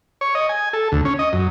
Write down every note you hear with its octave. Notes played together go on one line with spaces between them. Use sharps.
C#5
D#5
G#5
A4
D2
C#4
D#5
F#2